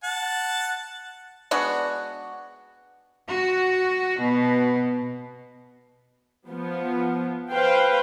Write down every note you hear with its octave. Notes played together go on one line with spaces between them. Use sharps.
F#5 A5
G#3 B3 D4 F#4
F#4
B2
F3 B3
B4 C5 F5 G5